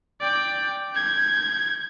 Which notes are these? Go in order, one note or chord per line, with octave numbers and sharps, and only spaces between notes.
D5 G5
G6 G#6